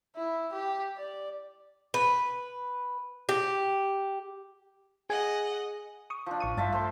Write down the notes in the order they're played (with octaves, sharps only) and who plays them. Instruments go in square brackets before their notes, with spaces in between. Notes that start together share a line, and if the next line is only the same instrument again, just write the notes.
[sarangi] E4
G4
D5
[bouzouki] B4
G4
[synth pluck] G#4 G#5 [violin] D#5 F#5
[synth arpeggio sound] C#6 D#6
[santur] F3 D4
[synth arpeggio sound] A1 C#6 D#7
[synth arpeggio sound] G2 [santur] F3 E5 A5
[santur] A3 C5